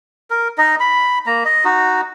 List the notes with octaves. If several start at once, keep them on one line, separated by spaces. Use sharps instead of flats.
A#4
D#4 D#5
B5
A#3 A#5
D#5
D#4 F#4